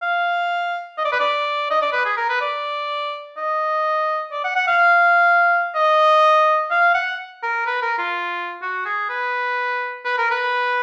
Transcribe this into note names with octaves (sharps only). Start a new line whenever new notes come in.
F5
D#5
D5
B4
D5
D#5
D5
B4
G#4
A#4
B4
D5
D#5
D5
F#5
F#5
F5
D#5
F5
F#5
A#4
B4
A#4
F4
F#4
G#4
B4
B4
A#4
B4